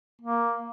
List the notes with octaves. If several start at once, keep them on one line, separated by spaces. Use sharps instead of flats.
A#3